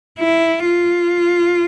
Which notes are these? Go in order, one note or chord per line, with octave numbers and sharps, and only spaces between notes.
E4
F4